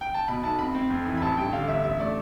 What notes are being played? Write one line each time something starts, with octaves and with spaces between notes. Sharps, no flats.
G5
A5
B2 B5
B1 A5
C4 B5
C4
F2
E3
B5
A1 A5
G2 G5
D3 F5
G1 E5
A1 E5
A3 D5